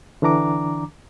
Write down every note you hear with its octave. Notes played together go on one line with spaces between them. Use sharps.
D3 E3 D4 A#5 D6